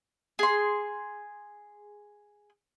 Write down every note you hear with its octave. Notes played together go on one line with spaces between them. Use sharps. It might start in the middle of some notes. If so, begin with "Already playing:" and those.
G#4 C6